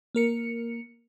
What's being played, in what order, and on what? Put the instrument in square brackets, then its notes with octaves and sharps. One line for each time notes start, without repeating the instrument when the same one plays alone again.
[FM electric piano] A#3 A#4 C#7